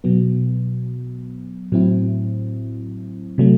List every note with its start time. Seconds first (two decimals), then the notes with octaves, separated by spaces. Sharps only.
0.04 B2 F#3 B3
1.72 A2 F#3 C4 E4
3.38 C3 F#3 A3